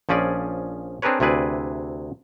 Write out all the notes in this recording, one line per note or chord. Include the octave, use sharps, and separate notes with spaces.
A#1 F3 C#4 G#4 D5
C4 D4 G#4 A#4 B4 C#5
D2 C3 E4 G#4 B4 D5